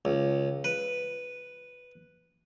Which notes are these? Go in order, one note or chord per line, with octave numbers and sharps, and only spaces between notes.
C#2
B4